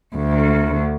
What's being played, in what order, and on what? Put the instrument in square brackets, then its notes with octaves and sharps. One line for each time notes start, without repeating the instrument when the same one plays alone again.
[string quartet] D2